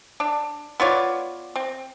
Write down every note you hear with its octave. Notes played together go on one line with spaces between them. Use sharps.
D4
B3 F4 C#5 D5
C4